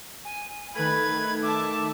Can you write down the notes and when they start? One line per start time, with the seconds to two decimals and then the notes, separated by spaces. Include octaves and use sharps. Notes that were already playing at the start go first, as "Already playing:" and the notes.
0.25 G#5
0.75 D#3 A3 B4 B5 G#6
1.42 E5 A5 D6